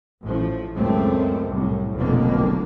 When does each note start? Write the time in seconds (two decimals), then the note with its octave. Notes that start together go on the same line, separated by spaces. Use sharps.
0.22 A1 A2 F3
0.76 C#2 F#2 A3 C4
1.49 C2 F#2 A2
1.94 F1 B1 F2 B2 D3 A#3